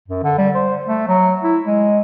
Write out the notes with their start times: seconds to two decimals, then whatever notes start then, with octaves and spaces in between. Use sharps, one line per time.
0.08 F#2
0.24 D3
0.38 G3
0.55 C5
0.87 A3
1.08 F#3
1.43 E4
1.66 G#3